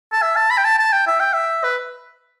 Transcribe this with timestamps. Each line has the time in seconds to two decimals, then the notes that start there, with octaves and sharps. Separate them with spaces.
0.13 A5
0.22 E5
0.36 A5
0.50 B5
0.58 G5
0.65 A5
0.79 A5
0.92 G5
1.07 E5
1.20 G5
1.33 E5
1.63 B4